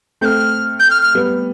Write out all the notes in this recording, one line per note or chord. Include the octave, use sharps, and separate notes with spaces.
A3 C4 F6 G6
G6
F6
F6
G3 B3